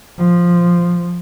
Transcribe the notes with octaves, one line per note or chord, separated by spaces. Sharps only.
F3